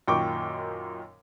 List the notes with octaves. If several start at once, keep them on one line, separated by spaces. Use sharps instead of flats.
F#2 A#2 D#3 G5 C#6 D6